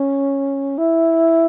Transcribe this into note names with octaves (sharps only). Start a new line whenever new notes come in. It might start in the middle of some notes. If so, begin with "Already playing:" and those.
Already playing: C#4
E4